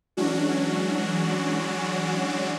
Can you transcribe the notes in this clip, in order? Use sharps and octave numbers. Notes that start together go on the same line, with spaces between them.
E3 F#3 G#3 C#4 D4 F#4